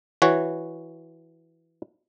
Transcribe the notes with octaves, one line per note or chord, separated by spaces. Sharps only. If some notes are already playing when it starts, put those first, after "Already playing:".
E3 F#4 C#5